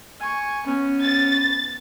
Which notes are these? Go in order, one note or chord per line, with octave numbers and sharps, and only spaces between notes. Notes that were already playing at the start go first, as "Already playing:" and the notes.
G#5 C#6
B3 C#4
A6